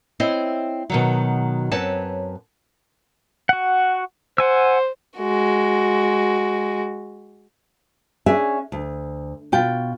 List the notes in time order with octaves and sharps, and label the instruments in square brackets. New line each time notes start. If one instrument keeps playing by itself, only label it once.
[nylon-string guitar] C4 E4 C5 C#5 D#5
B2 D#3 F#3
F#2 C4 B4 C#5 A5
[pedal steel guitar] F#4 F#5
[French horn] C5 [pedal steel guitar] F#5 G#5 E6
[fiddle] G#3 F#4
[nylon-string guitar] C#4 D4 G#4 E5
D2
B2 F4 G5